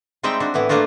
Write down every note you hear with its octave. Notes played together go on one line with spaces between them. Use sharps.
G3 G#3 C4 D#4 E5 G5
D4 F#4
A2 E3 B3 E4
A3 A#3 D4 F4 F#4